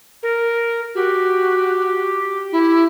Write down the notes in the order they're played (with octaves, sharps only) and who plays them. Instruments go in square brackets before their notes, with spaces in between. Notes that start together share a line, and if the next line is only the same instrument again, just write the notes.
[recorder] A#4
[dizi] F#4 [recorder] G4
[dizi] E4